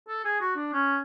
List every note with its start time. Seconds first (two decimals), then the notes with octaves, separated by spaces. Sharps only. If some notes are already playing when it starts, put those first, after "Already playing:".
0.08 A4
0.25 G#4
0.41 F#4
0.56 D4
0.73 C#4